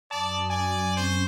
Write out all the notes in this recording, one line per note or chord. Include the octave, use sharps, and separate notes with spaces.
F#2 D5 A5 D#6
D5 G#5
C4 C#4 C5